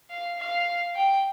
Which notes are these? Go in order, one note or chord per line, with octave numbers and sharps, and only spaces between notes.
F5
F5
G5